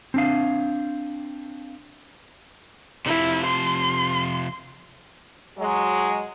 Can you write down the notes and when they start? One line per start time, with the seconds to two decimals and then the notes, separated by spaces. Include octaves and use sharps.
0.14 C4 D4 F5
3.06 C3 F3 E4
3.46 C6
5.58 F#3 G#3